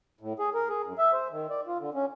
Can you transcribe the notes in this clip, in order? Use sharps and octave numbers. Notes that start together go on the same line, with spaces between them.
A2
G#4
A#4
G#4
F#2
E5
C5
D#3
D5
F4
D3
C#4